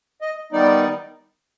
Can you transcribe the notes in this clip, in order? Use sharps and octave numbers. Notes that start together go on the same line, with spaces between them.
D#5
D#3 G3 B3 D#4 D5